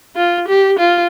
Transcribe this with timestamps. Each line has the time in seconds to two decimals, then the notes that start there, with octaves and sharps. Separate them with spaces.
0.16 F4
0.48 G4
0.79 F4